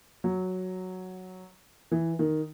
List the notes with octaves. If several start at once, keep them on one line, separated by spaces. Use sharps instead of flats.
F#3
E3
D#3